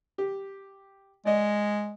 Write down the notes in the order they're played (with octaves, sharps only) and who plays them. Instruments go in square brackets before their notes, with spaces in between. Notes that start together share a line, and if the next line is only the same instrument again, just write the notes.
[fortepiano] G4
[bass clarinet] G#3 [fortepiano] D5 D#5